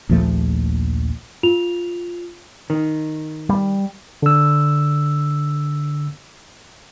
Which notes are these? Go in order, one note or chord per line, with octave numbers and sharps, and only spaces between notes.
A#1 D#2 F3 A3
F4 F7
D#3
G3
D3 E6